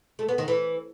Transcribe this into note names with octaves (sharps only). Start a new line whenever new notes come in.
A3
B3
D#3
E3